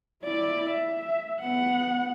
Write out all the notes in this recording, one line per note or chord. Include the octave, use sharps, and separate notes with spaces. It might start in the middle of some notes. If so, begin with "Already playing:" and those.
E4 D5
E5
B3 F#5